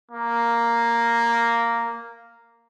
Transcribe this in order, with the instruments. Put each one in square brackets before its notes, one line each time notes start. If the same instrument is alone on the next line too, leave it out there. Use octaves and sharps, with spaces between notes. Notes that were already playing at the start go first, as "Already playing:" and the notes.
[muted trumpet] A#3